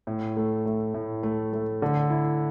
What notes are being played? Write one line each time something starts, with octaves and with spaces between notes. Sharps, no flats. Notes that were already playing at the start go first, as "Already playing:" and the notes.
A2
A3
A3
A2
A3
A3
D3
E4